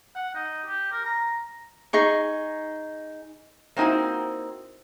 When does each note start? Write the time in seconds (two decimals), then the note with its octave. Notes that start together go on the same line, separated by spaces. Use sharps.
0.15 F#5
0.35 D#4
0.66 G4
0.92 A#4
1.05 A#5
1.93 D#4 G#4 C#6
3.76 A#3 C4 D#4 E4 F#4